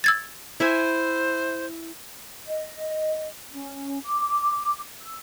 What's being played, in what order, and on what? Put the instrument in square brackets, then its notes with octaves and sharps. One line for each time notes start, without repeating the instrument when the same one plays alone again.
[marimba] E6 G#6 A6
[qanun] E4 E5 G#5 [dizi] C5
[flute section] D#5
C#4
D6
E6